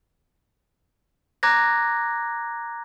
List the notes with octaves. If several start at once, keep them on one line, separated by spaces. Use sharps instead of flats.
A#5 D6 F#6 G#6 A#6